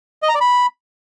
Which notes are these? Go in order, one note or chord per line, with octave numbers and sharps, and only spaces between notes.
D#5
A#5
D5
B5